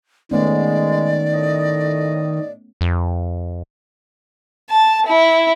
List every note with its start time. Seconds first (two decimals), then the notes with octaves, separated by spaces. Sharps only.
0.31 D#3 G#3 A3 B3 C#4 D5
1.31 A2 D#5
2.81 F2
4.70 A5
5.07 E4